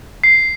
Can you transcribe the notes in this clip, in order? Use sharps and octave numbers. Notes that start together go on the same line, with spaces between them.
C7